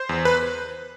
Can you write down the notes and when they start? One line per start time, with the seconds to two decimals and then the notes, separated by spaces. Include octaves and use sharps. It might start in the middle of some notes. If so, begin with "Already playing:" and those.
Already playing: C5
0.09 E2
0.25 B4